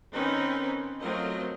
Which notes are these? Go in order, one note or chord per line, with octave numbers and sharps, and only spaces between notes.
D#3 C4 C#4 D#4 B4
F#3 A3 C4 F4 A#4 D#5